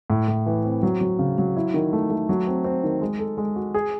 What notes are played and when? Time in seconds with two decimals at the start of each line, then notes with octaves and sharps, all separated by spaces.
0.10 A2
0.28 A2
0.46 E3
0.65 C4
0.83 F#3
1.01 F#3
1.19 C#3
1.38 F#3
1.56 E4
1.74 D#3
1.93 A3
2.10 A3
2.29 F#3
2.47 C4
2.64 C4
2.84 D#3
3.01 G#3
3.19 A4
3.38 G#3
3.56 F#4
3.74 G#4